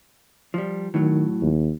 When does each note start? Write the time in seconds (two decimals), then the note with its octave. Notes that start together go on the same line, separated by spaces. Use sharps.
0.54 F3 G3
0.94 A2 D#3 F#3
1.41 D#2